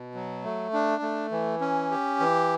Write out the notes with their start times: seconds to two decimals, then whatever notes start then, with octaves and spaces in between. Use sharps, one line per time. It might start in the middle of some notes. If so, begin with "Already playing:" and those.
Already playing: B2
0.14 F#3
0.44 A3
0.73 D4
1.02 A3
1.31 E3
1.61 C#4
1.91 G4
2.20 E3